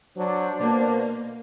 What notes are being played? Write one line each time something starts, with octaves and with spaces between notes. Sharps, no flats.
F#3 D4 C5
B2 A#3